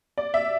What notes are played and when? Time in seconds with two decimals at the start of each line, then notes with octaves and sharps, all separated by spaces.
0.18 D5
0.34 E5